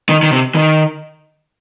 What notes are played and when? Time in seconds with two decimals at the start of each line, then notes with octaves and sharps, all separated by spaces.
0.09 D#3
0.23 D#3
0.32 C3
0.55 D#3